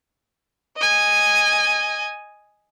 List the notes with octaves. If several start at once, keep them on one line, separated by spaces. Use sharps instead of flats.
D#5 G#5